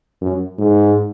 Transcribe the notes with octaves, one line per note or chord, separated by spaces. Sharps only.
F#2
G#2